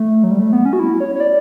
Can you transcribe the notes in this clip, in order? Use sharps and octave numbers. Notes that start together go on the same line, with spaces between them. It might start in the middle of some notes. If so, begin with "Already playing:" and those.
Already playing: A3
F#3
G3
A3
B3
C#4
F#4
E4
C#5
C#5
D5